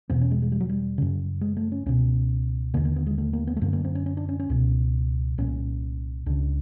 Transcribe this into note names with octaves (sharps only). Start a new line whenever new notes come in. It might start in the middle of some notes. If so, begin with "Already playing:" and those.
E2 B2 C4
C#4
G#3
G#3
G3
F#3
G3
F#2 C#3
G#3
A3
C#4
C#2 B2 C#4
D#2 D3 A#3
A#3
B3
G#3
A3
A#3
B3
A3
F#2 D3 A#3
A#3
C4
C#4
C#4
D4
C#4
C#4
C#2 B2
C2 A#2 C#4
C#2 C#3 D4